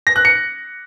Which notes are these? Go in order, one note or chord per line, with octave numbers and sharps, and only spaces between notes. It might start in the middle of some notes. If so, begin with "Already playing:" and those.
A#6
F#6
C#7